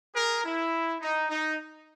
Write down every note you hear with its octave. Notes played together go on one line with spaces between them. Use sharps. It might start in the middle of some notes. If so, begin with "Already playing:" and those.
G#4 A#4
E4
D#4
D#4